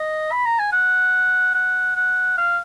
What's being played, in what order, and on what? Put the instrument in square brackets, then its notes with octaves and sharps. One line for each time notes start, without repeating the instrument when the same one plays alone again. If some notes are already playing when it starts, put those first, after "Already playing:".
Already playing: [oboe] D#5
B5
A#5
G#5
F#5
F#5
F#5
F5